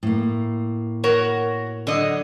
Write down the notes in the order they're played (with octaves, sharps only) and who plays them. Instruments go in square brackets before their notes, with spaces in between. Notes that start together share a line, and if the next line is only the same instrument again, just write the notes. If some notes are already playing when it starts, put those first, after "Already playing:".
[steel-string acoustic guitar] A2 A#3
[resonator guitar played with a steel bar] F#4 A#4 C#5
D3 F#3 D#5